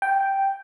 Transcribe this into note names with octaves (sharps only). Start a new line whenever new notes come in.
G5